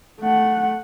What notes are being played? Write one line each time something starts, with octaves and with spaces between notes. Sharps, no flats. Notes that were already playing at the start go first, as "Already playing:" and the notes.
A3 F#5